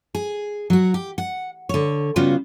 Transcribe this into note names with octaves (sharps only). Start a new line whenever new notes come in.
G#4
F#3 F#4
G4
F#5
D3 C#5
C#3 G3 B3 F4 F#4